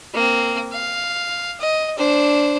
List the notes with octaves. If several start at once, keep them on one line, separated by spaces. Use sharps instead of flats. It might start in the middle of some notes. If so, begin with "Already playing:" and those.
A#3 C4
F5
D#5
D4 C5